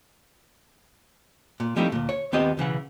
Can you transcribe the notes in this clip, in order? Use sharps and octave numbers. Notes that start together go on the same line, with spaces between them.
A#2
F3 G3 A3 C4 D#4 E4
D2 A#2
C#5
D#2 B3 C4 F4 G4 D#5
B1 C#3 E3 F#5